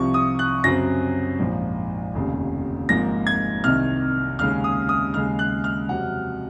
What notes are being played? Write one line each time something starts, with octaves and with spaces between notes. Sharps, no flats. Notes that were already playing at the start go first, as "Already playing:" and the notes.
Already playing: C2 C3 F3 C#6
D#6
F#6
F#2 C#3 F#3 C4 A#6
A#1 G#2 F3
F1 D#2 C#3
G#1 G#2 F3 A#3 A#6
G#6
C2 C3 D#3 F6
D#2 C#3 G#3 C#4 F6
D#6
D#6
D#2 C#3 G#3 F6
F#6
F6
F2 C3 F#3 F#5